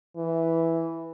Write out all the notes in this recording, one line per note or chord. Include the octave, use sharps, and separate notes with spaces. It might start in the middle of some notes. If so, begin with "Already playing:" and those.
E3